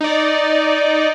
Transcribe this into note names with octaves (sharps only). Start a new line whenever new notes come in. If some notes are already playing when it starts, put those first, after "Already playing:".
D#4 D5